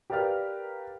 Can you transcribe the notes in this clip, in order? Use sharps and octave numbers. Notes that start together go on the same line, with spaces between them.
G4 A#4 B4 D5 F5 F6